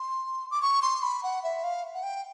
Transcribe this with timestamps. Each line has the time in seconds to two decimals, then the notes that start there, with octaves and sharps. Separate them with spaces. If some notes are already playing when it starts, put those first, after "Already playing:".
Already playing: C6
0.51 D6
0.62 C#6
0.82 C6
1.03 B5
1.23 F#5
1.43 E5
1.64 F5
1.94 F#5
2.03 G5